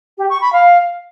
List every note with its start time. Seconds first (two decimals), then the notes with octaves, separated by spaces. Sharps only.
0.17 G4
0.29 C#6
0.41 B5
0.52 F5